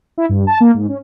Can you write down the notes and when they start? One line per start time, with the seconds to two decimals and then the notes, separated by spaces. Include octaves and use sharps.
0.18 E4
0.29 G2
0.47 A5
0.60 A#3
0.74 G#2
0.89 C#4